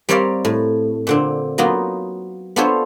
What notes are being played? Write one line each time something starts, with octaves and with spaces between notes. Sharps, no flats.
G3 C4 A#4 C#5 D5 F5
A2
A#2 D3 C4
F#3 A#3 B3 D#4 F4
B3 D4 F4 A4 C5 C#5